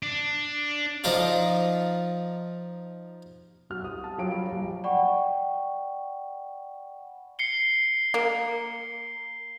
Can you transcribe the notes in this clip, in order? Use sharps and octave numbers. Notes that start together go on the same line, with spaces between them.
D4
F3 D#4 F4 D5
B1 F#4 F6
C2 D#6
A5
F3 F#3 G4 F5 D7
F#3 G3 F#4 G4
A#1
D5 F#5 G5 B5 C#6
C7 C#7 G7
A#3